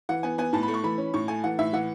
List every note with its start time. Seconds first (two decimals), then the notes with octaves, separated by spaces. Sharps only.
0.09 E3 F#5
0.23 B3 G#5
0.38 B3 G#5
0.53 A2 A5
0.63 B5
0.68 A3
0.74 C#6
0.83 E3 B5
0.98 C#4
1.14 A2 C#6
1.28 A3 G#5
1.44 E3 F#5
1.59 A2 E5
1.73 E3 F#5